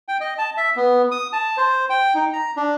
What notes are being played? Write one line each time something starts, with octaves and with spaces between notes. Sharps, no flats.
G5
D#5
A5
E5
B3
D#6
A5
C5
G5
D#4
A#5
D4